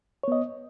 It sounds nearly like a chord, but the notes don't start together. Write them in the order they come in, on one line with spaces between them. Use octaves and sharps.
C#5 B3 D#5